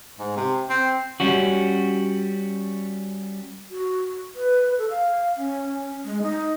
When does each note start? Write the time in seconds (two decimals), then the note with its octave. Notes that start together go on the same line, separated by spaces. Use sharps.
0.19 G#2
0.36 C3
0.70 C4
1.20 G3 C#4 F#4
3.70 F#4
4.35 B4
4.78 A4
4.91 F5
5.37 C#4
6.05 G#3
6.22 D#4